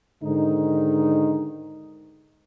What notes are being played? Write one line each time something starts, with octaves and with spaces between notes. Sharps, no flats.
G#2 D3 D#3 D#4